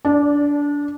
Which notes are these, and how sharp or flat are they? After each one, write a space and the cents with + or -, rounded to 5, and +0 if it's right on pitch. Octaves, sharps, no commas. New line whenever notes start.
D4 -20 D5 +0